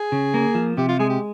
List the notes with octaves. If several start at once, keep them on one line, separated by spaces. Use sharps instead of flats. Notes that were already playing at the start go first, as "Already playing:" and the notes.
Already playing: G#4
C#3
A#3
F3
C3 G4
F4
G#3 G#4
G4